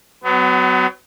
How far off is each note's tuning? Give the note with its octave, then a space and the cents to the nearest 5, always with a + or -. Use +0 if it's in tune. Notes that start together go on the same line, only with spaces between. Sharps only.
F#3 +15 B3 +35